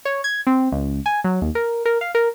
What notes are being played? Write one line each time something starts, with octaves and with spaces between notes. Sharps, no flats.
C#5
G#6
C4
C#2
G#5
F#3
D#2
A#4
A#4
F5
A#4